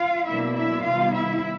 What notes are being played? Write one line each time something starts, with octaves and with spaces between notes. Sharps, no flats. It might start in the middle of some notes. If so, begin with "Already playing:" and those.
Already playing: F4 F5
B2 F#3 A#3 D4 E4 E5
E4 E5
C3 D#3 G3 B3 D#4 F4 F5
E4 E5